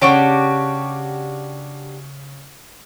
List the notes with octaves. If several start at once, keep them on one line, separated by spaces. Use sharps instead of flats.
C#3 D4 F#4 G4 C#5 D7